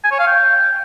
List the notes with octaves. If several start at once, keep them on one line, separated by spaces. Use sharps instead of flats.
G#5
C#5
F5
G5